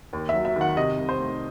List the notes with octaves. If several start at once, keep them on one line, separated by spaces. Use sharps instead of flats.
D#2
E5
F#3
E5
D#3 F#5
C3 D#5
C2
C5
A3